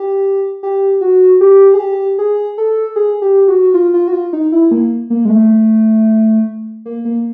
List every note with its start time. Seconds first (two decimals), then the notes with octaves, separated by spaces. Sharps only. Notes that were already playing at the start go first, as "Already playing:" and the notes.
Already playing: G4
0.63 G4
1.01 F#4
1.41 G4
1.74 G#4
1.80 G4
2.19 G#4
2.58 A4
2.96 G#4
3.22 G4
3.48 F#4
3.74 F4
3.94 F4
4.08 F#4
4.13 F4
4.33 D#4
4.52 E4
4.71 A#3
5.10 A#3
5.25 G#3
5.30 A3
6.86 A#3
7.05 A#3